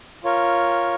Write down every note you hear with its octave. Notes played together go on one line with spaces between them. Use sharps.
F4 A#4 C#5